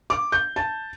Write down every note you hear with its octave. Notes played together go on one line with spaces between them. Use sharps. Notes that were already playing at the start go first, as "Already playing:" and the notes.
D6
G6
A5